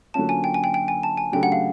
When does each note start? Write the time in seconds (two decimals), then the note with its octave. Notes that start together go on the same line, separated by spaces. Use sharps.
0.14 D3 F#3 A#3 C#4 F4 A5
0.29 G#5
0.44 G5
0.54 G#5
0.64 G5
0.74 G5
0.88 G#5
1.03 A5
1.17 G#5
1.32 C#3 F#3 A3 D4 G4 G5
1.43 F#5
1.52 F5